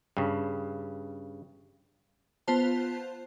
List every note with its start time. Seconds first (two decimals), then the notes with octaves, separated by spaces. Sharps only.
0.17 G2 C#3
2.48 B3 F4 C5 A5